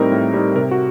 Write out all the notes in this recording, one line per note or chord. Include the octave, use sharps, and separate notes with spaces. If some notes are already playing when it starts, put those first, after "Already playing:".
Already playing: A2 G3 C4 D#4 A#4
A2
G3 C4 D#4
C3 A#4
F#4